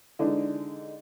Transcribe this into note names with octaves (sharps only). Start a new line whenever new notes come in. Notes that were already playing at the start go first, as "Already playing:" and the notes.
D3 E3 G#3 D4 D#4